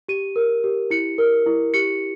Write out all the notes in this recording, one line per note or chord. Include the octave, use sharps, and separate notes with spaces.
G4 D#7
A#4
G4
E4 C#7
A#4
E4
G4 C#7